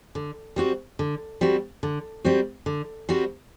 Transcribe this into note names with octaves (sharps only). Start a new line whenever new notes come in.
D3
G3 C4 F#4
D3
G3 C4 F#4
D3
G3 C4 F#4
D3
G3 C4 F#4